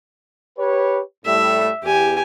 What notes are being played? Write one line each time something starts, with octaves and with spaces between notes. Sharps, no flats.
G4 B4 C#5
A2 G3 A3 E5
E2 G4 G#5